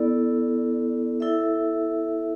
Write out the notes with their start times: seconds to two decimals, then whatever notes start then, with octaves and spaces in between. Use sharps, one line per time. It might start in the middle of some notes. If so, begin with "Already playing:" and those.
Already playing: B3 E4 A4 D5
1.20 E4 A4 E5